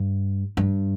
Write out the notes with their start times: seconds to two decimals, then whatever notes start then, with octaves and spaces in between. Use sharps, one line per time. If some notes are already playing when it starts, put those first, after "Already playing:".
Already playing: G2
0.57 G2